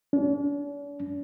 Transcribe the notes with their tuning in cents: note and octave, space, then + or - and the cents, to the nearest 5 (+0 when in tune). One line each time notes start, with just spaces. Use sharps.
D4 -45